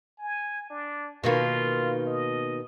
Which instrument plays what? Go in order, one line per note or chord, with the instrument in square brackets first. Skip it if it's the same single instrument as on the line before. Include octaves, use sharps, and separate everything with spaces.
[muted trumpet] G#5
D4
[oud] B2 D#3 A#3 [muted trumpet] F4
[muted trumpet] D#5